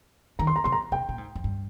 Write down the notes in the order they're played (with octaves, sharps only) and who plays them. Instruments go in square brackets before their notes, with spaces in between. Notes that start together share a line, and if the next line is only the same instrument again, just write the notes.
[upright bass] D#3 [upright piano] A#5
[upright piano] C6
A#5
[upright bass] C3 [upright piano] C6
[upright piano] A#5
[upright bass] C3 [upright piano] G5
[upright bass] A#2
G#2
F2
G2